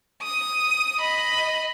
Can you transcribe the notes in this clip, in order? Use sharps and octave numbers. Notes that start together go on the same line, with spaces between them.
D#6
D#5 B5